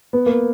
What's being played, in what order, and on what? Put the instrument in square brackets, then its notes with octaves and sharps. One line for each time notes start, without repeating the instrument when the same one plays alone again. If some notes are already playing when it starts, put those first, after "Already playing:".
[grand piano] B3
A#3